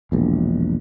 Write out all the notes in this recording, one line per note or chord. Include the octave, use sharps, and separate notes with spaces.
E1 A#1